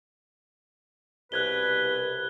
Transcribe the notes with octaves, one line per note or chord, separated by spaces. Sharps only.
C2 B2 B4 F#6 G#6 G7